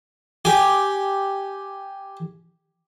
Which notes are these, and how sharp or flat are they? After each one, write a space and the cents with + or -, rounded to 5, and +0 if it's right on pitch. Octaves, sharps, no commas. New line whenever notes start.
G4 +0 G#5 +0